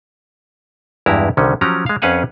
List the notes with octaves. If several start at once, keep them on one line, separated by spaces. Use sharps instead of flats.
E2 G2 G#3 E4 G4 A#5
C2 D3 D#3 C#4
F3 F#3 C#4 G4 A#5
G#3 F5
F2 C#4 B4 F5 F#5 G#5